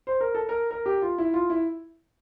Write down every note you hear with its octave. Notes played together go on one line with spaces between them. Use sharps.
C5
A#4
A4
A#4
A#4
G4
F4
E4
F4
E4